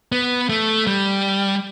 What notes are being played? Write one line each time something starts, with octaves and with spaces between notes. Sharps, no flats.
B3
A3
G3